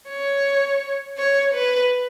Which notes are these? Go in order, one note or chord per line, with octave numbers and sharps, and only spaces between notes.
C#5
C#5
B4